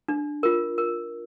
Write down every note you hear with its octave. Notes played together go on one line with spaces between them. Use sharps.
D4
F4 A#4
A#4